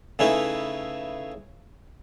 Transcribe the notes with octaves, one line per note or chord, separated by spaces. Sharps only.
C#3 A3 C#4 D#4 E4 B4